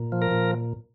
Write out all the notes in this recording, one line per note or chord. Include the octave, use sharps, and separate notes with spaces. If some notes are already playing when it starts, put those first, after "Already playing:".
Already playing: A#2
F3
A#4
A#2